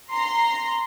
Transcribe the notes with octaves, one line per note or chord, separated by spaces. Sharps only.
A#5 C6